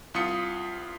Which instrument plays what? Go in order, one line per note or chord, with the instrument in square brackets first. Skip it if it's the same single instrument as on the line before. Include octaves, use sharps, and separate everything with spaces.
[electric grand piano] C2 F4 D#6 C#7